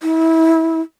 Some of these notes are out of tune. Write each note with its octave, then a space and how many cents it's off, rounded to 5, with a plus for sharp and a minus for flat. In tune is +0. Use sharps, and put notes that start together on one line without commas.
E4 -25